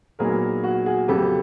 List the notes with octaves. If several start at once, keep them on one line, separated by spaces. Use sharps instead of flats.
A#2 F#3 B3 D#4 G#4 A#4
F#4
F#4 G#4
F2 C#3 F#3 B3 G4 A4